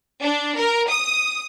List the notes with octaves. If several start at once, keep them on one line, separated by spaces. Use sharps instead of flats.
D4
A#4
D#6